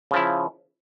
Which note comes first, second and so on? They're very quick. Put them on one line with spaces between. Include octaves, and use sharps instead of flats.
C#3 F3 E4